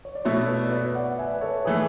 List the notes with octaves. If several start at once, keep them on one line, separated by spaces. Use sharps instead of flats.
C#5
D5
B2 A3 E4 C#5 E5
B4 D5
B4 D5
D5 F#5
E5 G#5
B4
A4 C#5
E3 A3 G#4 B4